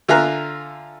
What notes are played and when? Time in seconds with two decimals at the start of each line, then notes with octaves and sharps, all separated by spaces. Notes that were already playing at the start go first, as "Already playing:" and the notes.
0.08 D3 F4 E5 G#5 A#5 F#6